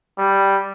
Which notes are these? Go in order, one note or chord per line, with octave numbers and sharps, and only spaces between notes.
G3